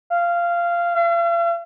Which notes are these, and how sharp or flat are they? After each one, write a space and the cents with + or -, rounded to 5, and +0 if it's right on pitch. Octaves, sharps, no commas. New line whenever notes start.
F5 -15
F5 -45